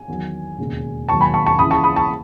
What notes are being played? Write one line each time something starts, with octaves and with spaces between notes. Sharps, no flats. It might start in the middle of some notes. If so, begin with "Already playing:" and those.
Already playing: G#5
E2 D#3 F#3
E1 D#2 C#3
E1 D#2 D#3 F#3 A5 C#6
G#5 B5
A5 C#6
A5 C#6
C#2 C#3 E3 B5 D#6
A5 C#6
B5 D#6
A5 C#6